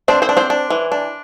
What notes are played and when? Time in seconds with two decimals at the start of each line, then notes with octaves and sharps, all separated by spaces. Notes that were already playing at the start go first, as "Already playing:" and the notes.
0.08 C4 D4 C5
0.22 C4 C5
0.29 D4
0.37 C4 C5
0.50 D4
0.70 E3
0.92 D4